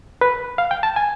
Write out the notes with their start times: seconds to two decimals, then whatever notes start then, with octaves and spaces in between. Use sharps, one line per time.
0.21 B4
0.58 F5
0.71 G5
0.83 A5
0.96 G#5